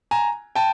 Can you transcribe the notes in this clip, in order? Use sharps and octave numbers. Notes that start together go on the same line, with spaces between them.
G#5 A#5
G5 A5